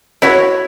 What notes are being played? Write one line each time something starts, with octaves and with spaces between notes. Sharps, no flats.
E4 F#4 C#5